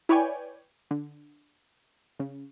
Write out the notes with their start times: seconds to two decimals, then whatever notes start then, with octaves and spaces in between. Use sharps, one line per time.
0.09 E4 B4 C#5 D5 G5 G#5
0.91 D3
2.20 C#3